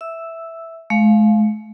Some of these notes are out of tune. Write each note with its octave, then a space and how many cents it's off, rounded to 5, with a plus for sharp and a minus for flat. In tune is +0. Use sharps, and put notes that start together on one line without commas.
E5 +0 E6 +0
G#3 +45 F5 +0